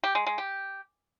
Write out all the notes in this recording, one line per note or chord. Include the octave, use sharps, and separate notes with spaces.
G4
G#3
G#3
G4